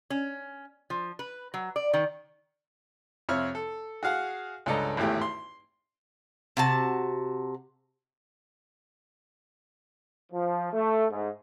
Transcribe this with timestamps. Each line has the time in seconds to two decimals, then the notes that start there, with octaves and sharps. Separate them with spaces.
0.10 C#4
0.90 F3
1.19 B4
1.54 F#3
1.76 D5
1.93 D#3
3.29 F2 C3 C#5 E5 F6
3.55 A4
4.03 F#4 G#4 F5 F#5
4.66 C#2 G2 A4 D5 D#5 A#5
4.97 G#1 E2 A2 A3 G4 G5
5.21 C6
6.57 C3 F#4 A5
10.32 F3
10.72 A3
11.11 G#2